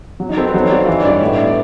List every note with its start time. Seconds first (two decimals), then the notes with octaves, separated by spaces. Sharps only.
0.20 F#3
0.29 D#4
0.37 C4 A4
0.45 B4
0.54 F#3 C5
0.62 C#5
0.70 F#3 D5
0.79 F5
0.87 E3 E5
0.95 D#5
1.04 G2 D5
1.12 C#5
1.21 A2 E5
1.37 B3 E5
1.47 D5